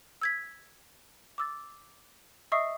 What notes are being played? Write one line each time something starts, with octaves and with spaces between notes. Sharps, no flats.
E6 G#6 B6
D6 E6 A6
D#5 E5 C#6 D#6 E6 C7